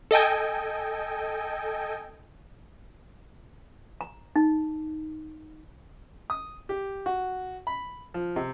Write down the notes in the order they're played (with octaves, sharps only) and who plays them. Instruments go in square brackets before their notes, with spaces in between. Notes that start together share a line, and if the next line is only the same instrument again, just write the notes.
[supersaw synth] A4 D#5 G5 G#5
[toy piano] A#5
D#4
[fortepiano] D#6
G4
F#4
B5
F3
C3